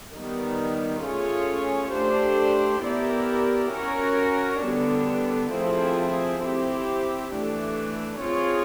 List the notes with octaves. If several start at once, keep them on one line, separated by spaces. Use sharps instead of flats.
D#3 G3 B3
A3 C#4 F4 G#4 C#5
A3 D4 G4 C5
B3 E4 G4 A#4 D5
C#4 F#4 A#4 C#5
D3 G3 B3 D4
F3 A3 C4 E4 G#4
C4 E4 G4
E3 A3 D4
C4 F4 G#4 C#5